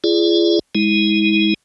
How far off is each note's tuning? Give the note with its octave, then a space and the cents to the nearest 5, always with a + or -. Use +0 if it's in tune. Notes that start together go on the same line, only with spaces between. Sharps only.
F4 -45 G#4 +5 D5 +0
G#3 -5 E4 -40